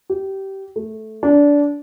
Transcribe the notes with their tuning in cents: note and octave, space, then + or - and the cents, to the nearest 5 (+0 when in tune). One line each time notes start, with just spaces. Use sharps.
G4 -20
A3 -10
D4 -20